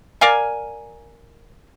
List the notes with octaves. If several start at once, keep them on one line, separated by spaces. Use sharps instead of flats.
A#4 D5 F5 G#5